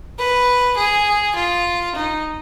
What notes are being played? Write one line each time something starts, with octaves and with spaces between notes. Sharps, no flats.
B4
G#4
F4
D#4